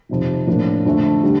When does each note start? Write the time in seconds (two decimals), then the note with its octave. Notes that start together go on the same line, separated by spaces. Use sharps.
0.09 F2 C3 D#3
0.47 A#1 A2 F3 A#3 D4
0.85 F2 D3 A3
1.23 D3 G3